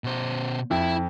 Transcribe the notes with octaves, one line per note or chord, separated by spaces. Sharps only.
B2 C5
F2 E4